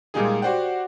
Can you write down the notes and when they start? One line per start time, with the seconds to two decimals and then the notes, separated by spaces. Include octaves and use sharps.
0.14 A#2 G3 G#3 D#4 F4 G#4
0.42 F#4 G4 C5 D5 F#5 G5